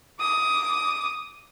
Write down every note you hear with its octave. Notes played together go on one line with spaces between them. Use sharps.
D6 D#6